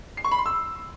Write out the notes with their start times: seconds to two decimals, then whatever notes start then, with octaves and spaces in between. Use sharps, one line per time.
0.17 C7
0.24 C#6
0.32 B5
0.39 C6
0.46 E6